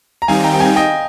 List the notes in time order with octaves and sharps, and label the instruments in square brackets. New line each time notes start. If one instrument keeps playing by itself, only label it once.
[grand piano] A#5
[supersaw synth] D#3 G3 C4 D#4 G4 [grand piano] F5 G#5
[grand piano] G5 A#5
G5
F5 G#5
D#5 G5